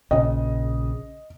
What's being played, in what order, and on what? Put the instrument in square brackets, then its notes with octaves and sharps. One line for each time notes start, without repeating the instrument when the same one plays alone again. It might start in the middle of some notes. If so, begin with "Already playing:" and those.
[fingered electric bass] A#1 C#3 [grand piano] D#5